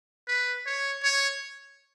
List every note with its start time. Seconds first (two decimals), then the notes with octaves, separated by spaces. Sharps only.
0.28 B4
0.66 C#5
1.03 C#5